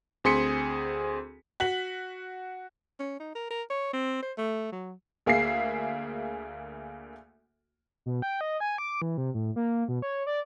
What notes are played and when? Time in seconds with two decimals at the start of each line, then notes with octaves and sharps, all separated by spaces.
0.24 D2 C4 G#4 C6 B6 C#7
1.60 F#4 B6 F#7
3.00 C#4
3.20 D#4
3.35 A#4
3.50 A#4
3.70 C#5
3.93 C4
4.22 C5
4.38 A3
4.72 F#3
5.26 D2 A#3 G#4 E5 C7
8.06 B2
8.22 G5
8.41 D#5
8.60 G#5
8.78 D6
9.02 E3
9.18 C3
9.34 A2
9.56 A#3
9.88 B2
10.02 C#5
10.27 D5